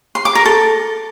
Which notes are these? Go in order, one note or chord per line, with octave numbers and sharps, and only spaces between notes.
C6
D6
A#4
A4